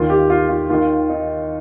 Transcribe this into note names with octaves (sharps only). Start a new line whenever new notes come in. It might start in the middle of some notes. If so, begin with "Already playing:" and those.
Already playing: D#2 D#3 F4
G4
F4
F4
D#2 D#3 F4
D#4